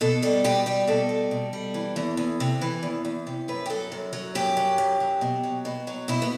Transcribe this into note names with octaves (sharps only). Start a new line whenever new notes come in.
B2 A4
G3 A4
B2 G4
G3 G4
B2 A4
G3
B2
G3
E3
E2
E2
C3
E3
E2
E2
C3
F#2 B4
G4
F#3 A4
F#2
F#3
F#2 G4
F#3
F#2
F#3
B2
F#3
B2
F#3
B2 E4
B3